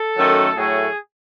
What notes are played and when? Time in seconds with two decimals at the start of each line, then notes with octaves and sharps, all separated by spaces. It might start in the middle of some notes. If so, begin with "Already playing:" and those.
Already playing: A4
0.17 F#2 D#3 F#3 A3
0.56 A2 F#3 A3 G#4